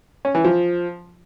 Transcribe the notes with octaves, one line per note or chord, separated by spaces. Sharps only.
C#4
E3
F3